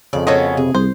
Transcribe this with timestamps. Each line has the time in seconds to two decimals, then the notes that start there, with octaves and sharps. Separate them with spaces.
0.13 F2 C#3 D5
0.27 A#3 B3 C#4 F#4 A4 D#5
0.57 C3 G#4
0.75 C2 C5